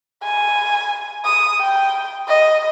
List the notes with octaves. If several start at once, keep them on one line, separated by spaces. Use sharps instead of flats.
G#5
D#6
G5
D#5